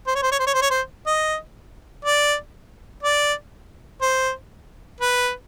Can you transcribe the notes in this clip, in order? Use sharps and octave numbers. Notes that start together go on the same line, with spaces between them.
C5
C#5
C5
C#5
C5
C#5
C5
C#5
C5
D#5
D5
D5
C5
B4